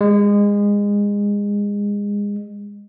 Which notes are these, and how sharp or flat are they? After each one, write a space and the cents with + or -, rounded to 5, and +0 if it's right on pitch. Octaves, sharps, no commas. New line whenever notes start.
G#3 -25